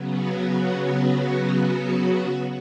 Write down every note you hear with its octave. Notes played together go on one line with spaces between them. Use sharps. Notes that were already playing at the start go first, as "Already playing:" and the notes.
Already playing: C#3 F#3 B3
F#4
F#4